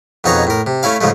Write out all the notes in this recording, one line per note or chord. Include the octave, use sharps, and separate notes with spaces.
F2 B2 D#4 G#4 C#5 A#5
A2 A#4
C3
A3 C#4 E4 F5
G#2 C#3 F3 G#3 A3